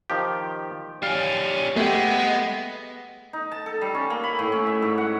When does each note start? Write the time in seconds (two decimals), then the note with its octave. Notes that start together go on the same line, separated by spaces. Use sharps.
0.10 D#3 F3 G4
1.03 G3 C#4 F5
1.76 G#3 A3 B3 G4
3.33 D#4
3.52 A5
3.66 A4
3.81 G3
3.95 C#4
4.10 A#3
4.24 B5
4.39 A2
4.52 C#4
4.67 E5
4.82 G#2
4.98 F#5